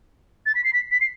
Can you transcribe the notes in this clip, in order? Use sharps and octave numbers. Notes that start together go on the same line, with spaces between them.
A6
B6
C7
B6
B6
C7